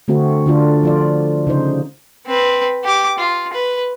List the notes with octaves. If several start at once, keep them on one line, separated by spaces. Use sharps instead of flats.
D3 A3 C4 F#4
D3 D4 F4
F3 F4 D5
C#3 D#4 C5
C4 B4
G4 D6
F4
B4